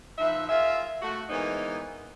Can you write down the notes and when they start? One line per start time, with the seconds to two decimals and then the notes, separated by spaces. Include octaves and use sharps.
0.19 F3 D#4 B4 E5
0.49 F4 G#4 A#4 E5
1.02 A3 F#4
1.30 E3 G#3 A#3 B3 D#4 C5